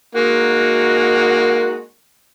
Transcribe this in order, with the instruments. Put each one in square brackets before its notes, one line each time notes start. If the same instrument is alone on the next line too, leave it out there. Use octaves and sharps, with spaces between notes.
[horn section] G#3 D#4 F#4 [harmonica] A#3